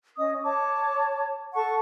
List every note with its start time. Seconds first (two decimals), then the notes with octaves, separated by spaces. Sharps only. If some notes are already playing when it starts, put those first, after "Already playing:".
0.17 C#4 D#5 D#6
0.42 C#5 A5 D6
1.53 A4 F#5 A5 C#6